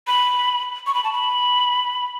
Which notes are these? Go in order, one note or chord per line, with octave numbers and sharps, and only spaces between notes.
B5
C#6
B5
A5
B5